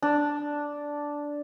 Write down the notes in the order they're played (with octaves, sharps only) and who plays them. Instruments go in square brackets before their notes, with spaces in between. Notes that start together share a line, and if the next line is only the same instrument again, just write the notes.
[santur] D4